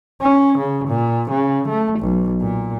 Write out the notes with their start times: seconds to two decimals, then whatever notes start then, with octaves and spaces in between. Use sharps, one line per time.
0.22 C#4
0.59 C#3
0.88 A#2
1.31 C#3
1.69 A3
2.00 B1
2.41 A#2